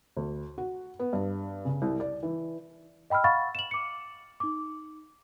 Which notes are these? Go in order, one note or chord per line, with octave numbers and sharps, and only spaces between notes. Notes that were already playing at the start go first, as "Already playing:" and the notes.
D2
F#4
B3
G2
C#3
C2
D5
E3
D#5 G5 B5 E6 F6
F5 F#5 B5 C#6 A6
E7 F#7
D6 C#7
D#4 D6